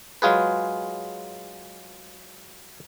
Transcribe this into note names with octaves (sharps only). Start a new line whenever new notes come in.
F#3 G#3 F4 G#4 B4